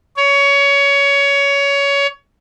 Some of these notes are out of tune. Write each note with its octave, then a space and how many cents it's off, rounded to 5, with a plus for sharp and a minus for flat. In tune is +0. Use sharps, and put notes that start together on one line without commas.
C#5 +20